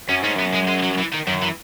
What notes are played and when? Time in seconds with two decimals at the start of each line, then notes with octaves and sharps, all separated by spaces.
0.09 F#2 C#4
0.23 G#2 C#4
0.36 F#2 B3
0.54 G#3
0.67 G#3
0.83 F#3
0.98 E3
1.13 D#3
1.27 F#2 D#3
1.42 E3